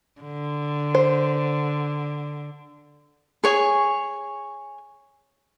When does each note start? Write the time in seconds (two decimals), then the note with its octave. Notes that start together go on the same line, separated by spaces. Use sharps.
0.22 D3
0.95 C5
3.44 G#4 C#5 G#5